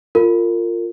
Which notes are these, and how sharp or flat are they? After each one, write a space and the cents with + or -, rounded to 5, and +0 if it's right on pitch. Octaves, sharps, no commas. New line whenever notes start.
F4 +0 A#4 -35